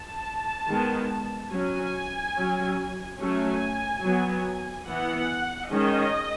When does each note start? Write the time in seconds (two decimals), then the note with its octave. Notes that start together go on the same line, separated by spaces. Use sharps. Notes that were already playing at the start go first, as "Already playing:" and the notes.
Already playing: A5
0.67 D#3 G#3 B3
1.51 F#3 C#4 G#5
2.35 F#3 C#4
3.19 F#3 A3 C#4 G#5
4.03 F#3 B3
4.86 E3 B3 F#5
5.71 D#3 G#3 C#4 D#5